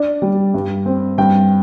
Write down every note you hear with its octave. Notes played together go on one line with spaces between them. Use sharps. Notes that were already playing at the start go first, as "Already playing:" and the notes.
Already playing: D4 D5
G3
G2
C4
G2 G5